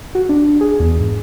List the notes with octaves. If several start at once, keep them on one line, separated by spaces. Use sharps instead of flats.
F#4
D4
G#4
E2
G#2